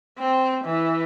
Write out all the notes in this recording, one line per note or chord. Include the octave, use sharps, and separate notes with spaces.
C4
E3